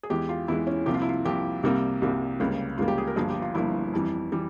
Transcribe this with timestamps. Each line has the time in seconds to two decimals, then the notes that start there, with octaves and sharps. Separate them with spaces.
0.03 G#4
0.10 E2 E3 G#3 G4
0.29 F4
0.48 E2 E3 G#3 E4
0.67 C#4
0.86 C2 C3 F3 A#3 G4
0.94 F4
1.02 E4
1.09 F4
1.25 C2 C3 F3 A#3 G4
1.63 C2 C3 G3 A#3
2.02 C2 C3 G3 A#3
2.40 C#2 C#3 G3 A#3
2.78 C#2 C#3 G3 A#3 F4
2.88 G4
2.98 G#4
3.07 A#4
3.16 G1 G2 F3 A#3 G#4
3.30 G4
3.42 F4
3.55 G1 G2 F3 A#3 E4
3.93 F2 E3 G3
4.32 E3 G3